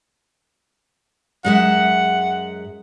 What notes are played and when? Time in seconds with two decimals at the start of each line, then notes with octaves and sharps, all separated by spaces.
1.45 F#2 G#3 E5 F#5